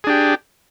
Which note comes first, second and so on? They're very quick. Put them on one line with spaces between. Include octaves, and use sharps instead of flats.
G#4 D4 G4